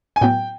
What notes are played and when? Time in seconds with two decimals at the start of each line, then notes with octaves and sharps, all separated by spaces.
0.16 G#5
0.21 A2 F#3 B3 G5